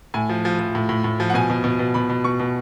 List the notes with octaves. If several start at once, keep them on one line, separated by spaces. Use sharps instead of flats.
A2 G#5
F3
F3
F3
A2
A2
A2
F3
F#5
B2 G#5
B2
B2
B2
B2 B5
B2
B2 C#6
B2